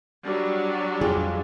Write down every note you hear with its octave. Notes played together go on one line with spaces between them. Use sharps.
F#3 G3 D4
F2 F4 G#4